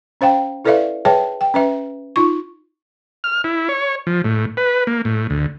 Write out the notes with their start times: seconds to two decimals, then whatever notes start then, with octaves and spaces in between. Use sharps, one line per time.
0.21 C#4 C5 F5 G5
0.65 E4 A4 B4 D5 E5 F5
1.05 G#4 B4 C#5 E5 G5 A5
1.41 G5
1.54 C#4 B4 E5
2.16 D#4 F4 C#6
3.24 F6
3.44 E4
3.69 C#5
4.07 F3
4.24 A2
4.57 B4
4.87 A#3
5.05 A2
5.30 D2